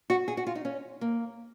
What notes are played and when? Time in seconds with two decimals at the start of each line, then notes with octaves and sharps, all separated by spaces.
0.10 F#4
0.28 G#4
0.37 F#4
0.47 F4
0.55 D#4
0.65 C#4
1.01 A#3